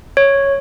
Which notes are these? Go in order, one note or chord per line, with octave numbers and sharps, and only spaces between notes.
C#5